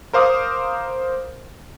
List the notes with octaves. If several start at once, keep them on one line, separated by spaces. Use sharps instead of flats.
A#4 C5 F5 D6 D#6